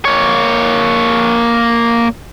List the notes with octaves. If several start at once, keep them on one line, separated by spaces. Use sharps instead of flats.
A#3 C#5